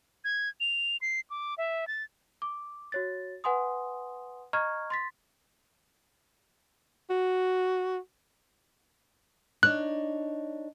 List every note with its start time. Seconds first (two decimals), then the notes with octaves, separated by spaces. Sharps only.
0.24 G#6
0.60 F7
1.01 C7
1.30 D6
1.58 E5
1.88 A6
2.42 D6
2.92 F#4 C#5 A6
3.44 B4 F#5 G#5 C6 D#6
4.53 D#5 A#5 C#6 F6 G#6
4.90 C6 A6 B6
7.10 F#4
9.63 D4 D#4 C#5 F#6